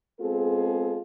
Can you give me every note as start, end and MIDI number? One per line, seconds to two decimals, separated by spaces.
0.20 1.00 56
0.20 1.00 59
0.20 1.00 60
0.20 1.00 65
0.20 1.00 68
0.20 1.00 69